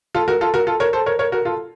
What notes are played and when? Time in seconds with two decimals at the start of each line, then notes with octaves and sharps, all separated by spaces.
0.14 F4 A4
0.28 F#4 A#4
0.41 F4 A4
0.54 F#4 A#4
0.67 F4 A4
0.80 A#4 C#5
0.93 A4 C5
1.06 A#4 C#5
1.19 A#4 C#5
1.32 F#4 A#4
1.45 F4 A4